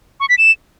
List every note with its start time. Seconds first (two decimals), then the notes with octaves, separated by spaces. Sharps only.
0.20 C#6
0.29 B6
0.38 E7